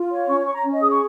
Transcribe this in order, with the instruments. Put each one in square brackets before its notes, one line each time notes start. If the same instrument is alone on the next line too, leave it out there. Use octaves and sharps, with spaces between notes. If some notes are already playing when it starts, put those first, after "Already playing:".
Already playing: [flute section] F4
C#5
C#4 C#6
C#5 C#6
A#5
C#4
D#5
G#4 D#6
C#6